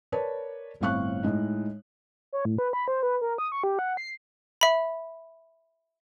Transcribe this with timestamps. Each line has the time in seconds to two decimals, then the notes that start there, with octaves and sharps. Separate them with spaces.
0.12 A#4 B4 C#5 D5 A5
0.81 G1 A2 C4 F5 C#6 F#6
1.23 A2 G#3 D#4
2.33 C#5
2.45 A2
2.58 B4
2.73 B5
2.88 C5
3.03 B4
3.21 A#4
3.38 D#6
3.52 C#6
3.64 G4
3.79 F#5
3.97 C7
4.61 E5 B5